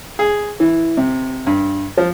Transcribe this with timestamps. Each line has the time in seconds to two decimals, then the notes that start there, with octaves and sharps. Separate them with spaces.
0.19 G#4
0.60 E3
0.97 C3
1.47 G2
1.98 F3